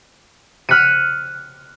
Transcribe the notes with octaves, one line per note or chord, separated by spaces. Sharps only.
F6 F#6 B6 C#7 D#7